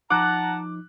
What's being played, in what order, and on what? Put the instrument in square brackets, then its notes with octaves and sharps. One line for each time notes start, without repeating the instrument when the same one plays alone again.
[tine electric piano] F3 D#4 [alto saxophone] F#5 [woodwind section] A5 A#5 [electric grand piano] D6 F#6